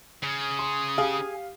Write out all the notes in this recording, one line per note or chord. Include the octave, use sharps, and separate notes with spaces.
C#3 D#6
C6
G4 G#4 F5